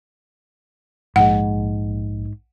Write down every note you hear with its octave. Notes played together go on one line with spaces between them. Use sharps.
A#1 G#2 G#3 F#5